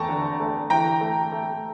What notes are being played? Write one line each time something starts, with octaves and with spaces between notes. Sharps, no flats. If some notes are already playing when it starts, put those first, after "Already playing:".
Already playing: E2 A3 G5 A5 A#5 C#6
D3
A3
E3 G5 A#5
A3
A3